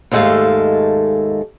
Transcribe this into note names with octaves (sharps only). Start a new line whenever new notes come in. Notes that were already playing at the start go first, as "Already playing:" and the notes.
D#2 G#2 G#3 A3 A4 F5